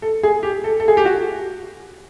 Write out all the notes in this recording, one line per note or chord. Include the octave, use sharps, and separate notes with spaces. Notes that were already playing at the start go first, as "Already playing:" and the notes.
A4
G#4
G4
A4
A4
G#4
G4
F#4